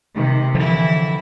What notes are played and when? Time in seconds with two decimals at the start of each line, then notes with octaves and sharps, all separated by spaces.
0.16 C3 D#3
0.55 D3 E3 F3 E4